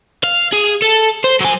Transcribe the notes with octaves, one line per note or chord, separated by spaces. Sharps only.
F5
G#4
A4
C5
F#3 G#5